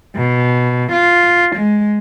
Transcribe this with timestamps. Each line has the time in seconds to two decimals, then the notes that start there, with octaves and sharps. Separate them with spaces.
0.16 B2
0.92 F4
1.56 G#3